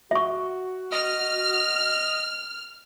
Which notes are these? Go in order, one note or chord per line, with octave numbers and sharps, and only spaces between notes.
F#4 E5 C#6
D#5 F6